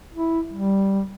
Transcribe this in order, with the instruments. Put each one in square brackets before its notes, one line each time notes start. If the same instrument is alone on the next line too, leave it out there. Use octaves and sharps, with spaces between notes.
[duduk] E4
G3